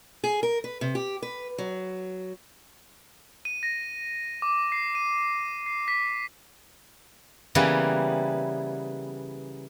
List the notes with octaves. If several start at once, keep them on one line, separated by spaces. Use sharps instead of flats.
G#4
A#4
B4
C3
G4
B4
F#3
D#7
A#6
D6
C7
D#7
C7
B6
C#3 E3 G3 A#3 B3